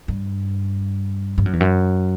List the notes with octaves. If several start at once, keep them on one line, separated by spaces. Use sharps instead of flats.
G2
G2
F#2
E2
F#2